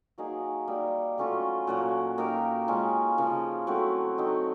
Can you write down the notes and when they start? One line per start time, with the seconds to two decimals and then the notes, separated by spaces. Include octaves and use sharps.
0.18 F#3 A#3 D#4 G#4
0.68 G3 A#3 D#4
1.18 F#3 A3 C#4 F4
1.67 A#2 F#3 A#3
2.18 A#3 D#4 G4 A#4
2.68 G#3 C#4 F4
3.18 C#3 F3 A#3
3.67 F#3 A3 C4 E4
4.18 F#3 A3 C4 D#4